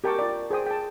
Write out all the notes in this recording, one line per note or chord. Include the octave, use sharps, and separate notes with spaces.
G4 A#4 G5 A5 C#6 D6
F4 D5
G#4 C5 G5 D#6
G5 A5